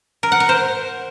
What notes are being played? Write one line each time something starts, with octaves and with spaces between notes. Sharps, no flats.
A#4
F#5
A#4
C5